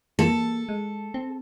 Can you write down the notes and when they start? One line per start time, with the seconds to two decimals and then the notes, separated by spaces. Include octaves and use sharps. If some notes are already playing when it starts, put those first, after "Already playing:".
0.19 A#3 A4
0.69 G#3
1.14 C4